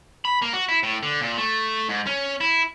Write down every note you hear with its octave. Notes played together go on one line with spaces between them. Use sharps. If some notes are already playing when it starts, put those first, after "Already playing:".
B5
A#3
F#4
E4
A2
D3
A#2
A3
G#2
C#4
E4